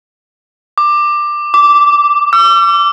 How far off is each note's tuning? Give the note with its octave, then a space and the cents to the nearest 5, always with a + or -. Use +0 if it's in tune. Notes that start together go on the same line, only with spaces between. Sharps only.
D6 +15
D6 -10
E6 +40